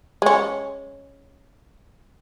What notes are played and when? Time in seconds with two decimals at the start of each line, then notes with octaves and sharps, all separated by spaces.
0.22 G#3 C#4